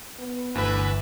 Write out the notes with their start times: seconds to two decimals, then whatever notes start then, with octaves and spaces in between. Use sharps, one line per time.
0.19 B3
0.55 G1 D2 E3 E4 B4 E5